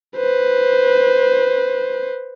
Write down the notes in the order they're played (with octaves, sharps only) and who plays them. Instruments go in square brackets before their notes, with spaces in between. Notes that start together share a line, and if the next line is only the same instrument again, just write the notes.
[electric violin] B4 C5